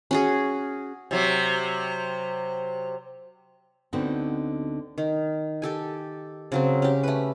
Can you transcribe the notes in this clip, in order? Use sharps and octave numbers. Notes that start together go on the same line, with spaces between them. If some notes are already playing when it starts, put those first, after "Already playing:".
C#4 F#4 G#4
C3 F#3
D2 D3 B3 C4 D#4 F#4
D#3
G4 A4 G#5
C#3 F#3 C4
C#4 G4
A3 B4